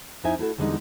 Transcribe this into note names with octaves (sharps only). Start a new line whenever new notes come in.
F2 C4 D#4 E4 E5 G#5
A3 E4 F#4 A4
E2 D3 G3 G#3 C#4 D#4